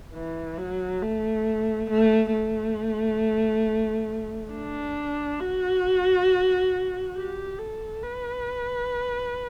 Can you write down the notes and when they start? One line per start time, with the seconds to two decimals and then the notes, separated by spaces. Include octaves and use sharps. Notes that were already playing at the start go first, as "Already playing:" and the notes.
0.14 E3
0.58 F#3
1.02 A3
1.89 A3
2.32 A3
4.52 D4
5.40 F#4
7.16 G4
7.59 A4
8.03 B4